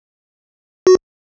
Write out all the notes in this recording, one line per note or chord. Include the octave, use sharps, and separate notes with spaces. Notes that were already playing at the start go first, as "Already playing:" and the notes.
F#4